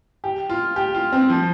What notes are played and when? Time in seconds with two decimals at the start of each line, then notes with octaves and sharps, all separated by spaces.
0.24 G4
0.50 F4
0.76 G4
0.95 F4
1.12 C4
1.30 F3